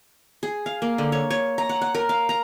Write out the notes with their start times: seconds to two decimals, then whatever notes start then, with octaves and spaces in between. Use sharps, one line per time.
0.43 G#4
0.66 F5
0.82 A#3
0.98 D3
1.12 C#5
1.30 C#5
1.58 A#5
1.69 F#5
1.81 F#5
1.94 A#4
2.09 F5
2.29 A#5